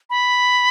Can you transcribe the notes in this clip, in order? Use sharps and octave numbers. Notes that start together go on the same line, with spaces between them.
B5